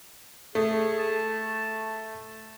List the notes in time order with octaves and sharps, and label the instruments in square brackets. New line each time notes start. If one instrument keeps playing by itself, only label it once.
[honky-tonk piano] A3 [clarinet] G#4
[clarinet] A5